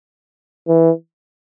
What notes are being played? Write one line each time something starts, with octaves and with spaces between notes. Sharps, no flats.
E3